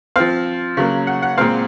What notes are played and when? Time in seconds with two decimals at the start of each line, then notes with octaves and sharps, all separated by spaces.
0.16 F3 C4 F5
0.77 C#3 F#3 A#3
1.07 F#5
1.22 F#5
1.38 A#2 G#3 C4 F5